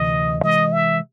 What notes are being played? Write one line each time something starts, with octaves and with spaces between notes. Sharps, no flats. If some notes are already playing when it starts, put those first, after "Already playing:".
Already playing: D2 C3 E3 D#5
C3 E3 G#3 D#5
E5